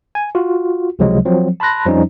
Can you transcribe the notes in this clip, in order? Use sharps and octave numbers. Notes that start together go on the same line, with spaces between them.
G#5
F4 F#4
C#2 C3 F3 F#3 G#3
F3 F#3 C4
A5 B5 C6 F#6 A#6
F2 F3 G3 C#4 D#4